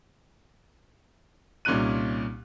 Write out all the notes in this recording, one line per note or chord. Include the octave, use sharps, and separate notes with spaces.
C2 A#2 C#4 D#4 F#6 D#7